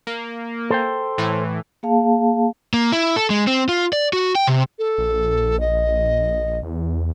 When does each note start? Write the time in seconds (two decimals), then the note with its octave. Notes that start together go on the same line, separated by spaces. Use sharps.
0.07 A#3
0.70 A4 C5 G5
1.18 A2 E3
1.83 A#3 G#4 F5 A5
2.74 A#3
2.92 E4
3.16 A4
3.30 G#3
3.47 C4
3.69 F4
3.93 D5
4.13 F#4
4.35 G5
4.47 C3
4.79 A4
4.98 A#1
5.60 D#5
6.63 E2